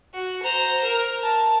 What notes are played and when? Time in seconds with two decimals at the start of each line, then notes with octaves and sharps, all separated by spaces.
0.14 F#4
0.43 C5 A#5
0.84 A#4
1.23 A5